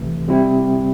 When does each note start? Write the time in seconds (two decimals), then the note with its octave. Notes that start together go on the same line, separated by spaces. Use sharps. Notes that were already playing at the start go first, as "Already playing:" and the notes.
Already playing: C2 C3 E3 A3
0.27 C3 G3 C4 E4